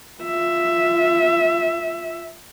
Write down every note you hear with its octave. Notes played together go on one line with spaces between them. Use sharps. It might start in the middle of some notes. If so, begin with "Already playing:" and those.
F4 E5